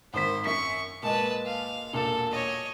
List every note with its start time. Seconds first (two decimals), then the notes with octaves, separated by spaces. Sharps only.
0.14 G#1 D#3 C5 B6
0.45 F#2 C#6 B6
1.03 A#2 G#3 B4 A5
1.46 F5
1.93 E1 A#2 A4
2.31 C#5 D#5